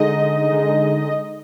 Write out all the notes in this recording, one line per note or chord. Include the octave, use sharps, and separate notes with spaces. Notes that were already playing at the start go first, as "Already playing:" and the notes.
Already playing: D3 G#3 D#4 D#5
D3 G#3 D#4